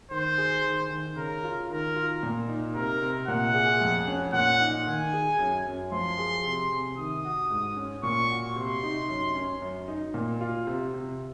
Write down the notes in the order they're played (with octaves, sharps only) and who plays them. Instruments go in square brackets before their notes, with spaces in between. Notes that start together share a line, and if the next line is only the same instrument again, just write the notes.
[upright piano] D#3 [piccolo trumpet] C5
[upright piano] G#4
D#3
D#3
[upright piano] C#3 [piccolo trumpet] A#4
[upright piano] F4
[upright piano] D#3 [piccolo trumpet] A#4
[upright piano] F4
A#2
D#4
[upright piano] C3 [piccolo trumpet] A#4
[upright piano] C3
[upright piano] A#2 [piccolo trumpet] F#5
[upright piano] G#4
F2
C#4
[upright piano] A#2 [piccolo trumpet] F#5
[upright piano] D#4
[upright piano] D#3 [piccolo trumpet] G#5
[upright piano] G#4
F#2
F#2
[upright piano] F3 [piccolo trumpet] C6
[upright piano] G#4
C3
C3
[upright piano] D#3 [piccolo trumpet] D#6
[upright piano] F#4
G#2
C#4
[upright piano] A#2 [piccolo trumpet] C#6
[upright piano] F#4
[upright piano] C3 [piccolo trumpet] C6
[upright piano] D#4
F#2
C#4
F#2
D#4
A#2
F4
C3
C3